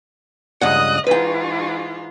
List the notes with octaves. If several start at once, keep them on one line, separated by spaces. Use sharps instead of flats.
C#2 G2 D#5 F#5 D#6 F#6
G#2 E3 F4 B4 G5